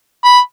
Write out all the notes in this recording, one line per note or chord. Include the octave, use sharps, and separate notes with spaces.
B5